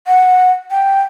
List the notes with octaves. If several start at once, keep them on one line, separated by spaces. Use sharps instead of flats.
F#5
G5